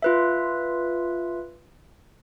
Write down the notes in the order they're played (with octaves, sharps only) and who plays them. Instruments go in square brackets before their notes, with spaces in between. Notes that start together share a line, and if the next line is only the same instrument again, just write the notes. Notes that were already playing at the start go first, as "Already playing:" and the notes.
[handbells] F4 B4 E5